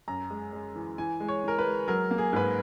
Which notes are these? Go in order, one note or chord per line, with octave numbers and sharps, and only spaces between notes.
F#2 A#5
G#3
G#3
E3
E3 G#5
G#3
C#5
E3 A#4
B4
G#3
F#3 A#4
A#3
G#4
G#2 B4